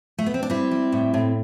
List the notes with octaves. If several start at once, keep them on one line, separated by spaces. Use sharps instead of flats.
A3
B3
C4
D4
G3 C4 E4
G3
A2
A2